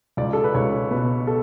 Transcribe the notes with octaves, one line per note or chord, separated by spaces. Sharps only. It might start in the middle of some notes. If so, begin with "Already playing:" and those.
C#2 D5
A4
B4
C#2 C#5
B2 B4
A4